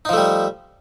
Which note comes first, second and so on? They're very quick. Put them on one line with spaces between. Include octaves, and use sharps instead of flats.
D#4 F3 A3 G3